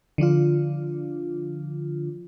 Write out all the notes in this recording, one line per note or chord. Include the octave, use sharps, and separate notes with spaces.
D3 F3 D4 F4